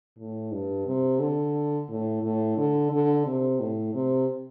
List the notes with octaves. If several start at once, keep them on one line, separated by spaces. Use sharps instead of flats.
A2
G2
C3
D3
A2
A2
D3
D3
C3
A2
C3